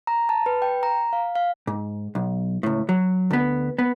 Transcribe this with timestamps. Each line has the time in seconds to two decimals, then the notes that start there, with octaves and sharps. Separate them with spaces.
0.07 A#5
0.29 A5
0.46 B4
0.62 G5
0.83 A#5
1.13 F5
1.35 F5
1.67 G#2
2.15 B1
2.63 C#2 A2
2.89 F#3
3.31 D2 B3
3.78 B3